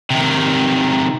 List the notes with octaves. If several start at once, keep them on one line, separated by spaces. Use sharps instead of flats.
C3 D#3